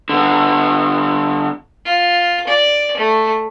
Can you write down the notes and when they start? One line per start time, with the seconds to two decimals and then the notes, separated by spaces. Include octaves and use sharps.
0.09 D3 B3
1.85 F4
2.47 D5
2.97 A3